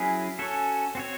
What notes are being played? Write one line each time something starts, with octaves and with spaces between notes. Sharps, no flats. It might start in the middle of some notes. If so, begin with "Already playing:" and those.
Already playing: F#3 C#4 E4 G#4
C#4 F#4 A4 C#5
C4 F#4 C#5